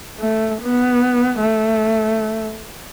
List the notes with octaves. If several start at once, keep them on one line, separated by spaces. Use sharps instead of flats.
A3
B3
A3